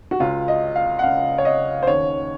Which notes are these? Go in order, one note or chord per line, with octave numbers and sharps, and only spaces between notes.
F#4
C#2 C#3 F4
D#5
F5
F#5
C#2 C#3 F5
C#5
D#5
C5
D#2 C#3 C#5